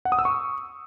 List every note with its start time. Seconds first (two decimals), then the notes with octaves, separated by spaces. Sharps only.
0.05 F#5
0.12 D#6
0.19 E6
0.25 C#6